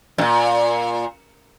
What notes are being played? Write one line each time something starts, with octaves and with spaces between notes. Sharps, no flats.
F#2 A#2